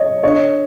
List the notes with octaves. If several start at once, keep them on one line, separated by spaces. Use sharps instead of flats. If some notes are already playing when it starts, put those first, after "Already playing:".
Already playing: C#5 D#5
D3 C#5 D#5